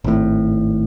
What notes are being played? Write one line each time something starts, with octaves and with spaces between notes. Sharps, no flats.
G#1 A2